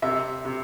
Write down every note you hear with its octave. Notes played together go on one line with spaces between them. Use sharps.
C3 E5
C3